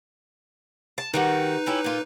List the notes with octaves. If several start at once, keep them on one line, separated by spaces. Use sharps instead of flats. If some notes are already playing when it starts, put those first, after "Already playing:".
A5
D#3 G3 D#4 F#4 B4
C#4 E4 G4
A#2 F4